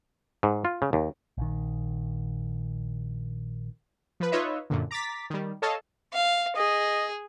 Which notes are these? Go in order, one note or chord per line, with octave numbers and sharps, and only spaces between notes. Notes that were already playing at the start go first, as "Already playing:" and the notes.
G#2
F4
C#3
D#2
A#1 D#3
F3 B4
D#4 F4 B4 C#5 D#5 E5
F#2 A#2 D3
A#5 D6 A6 B6
D#3 G3
A4 C#5 D#5 F5 A5
F5
G#4 D#5